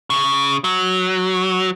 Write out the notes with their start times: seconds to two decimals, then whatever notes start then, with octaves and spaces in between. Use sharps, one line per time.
0.10 C#3
0.64 F#3